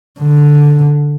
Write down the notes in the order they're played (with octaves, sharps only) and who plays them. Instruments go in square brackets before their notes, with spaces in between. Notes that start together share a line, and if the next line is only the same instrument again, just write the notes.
[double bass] D3